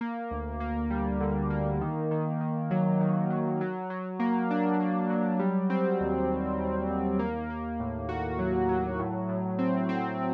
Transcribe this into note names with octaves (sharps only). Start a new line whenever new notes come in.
A#3
D2
A#3
G3
D3
A#3
D#3
D#3
D#3
F#3
D#3
F#3
F#3
F#3
A#3
D4
A#3
F#3
G3
C4
D#2
D#2
D#2
D#2
A#3
A#3
A2
F#4
F#3
F#3
A2
A2
C4
C4